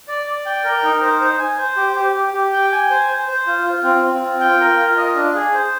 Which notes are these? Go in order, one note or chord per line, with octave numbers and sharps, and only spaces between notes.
D5
D5
G5
A#4
D#4
C5
C5
G#5
C5
G4
G4
G4
G4
G5
G#5
C5
C5
C5
F4
F4
C4
C4
F4
G5
A#4
F4
D#5
D4
G#4
C5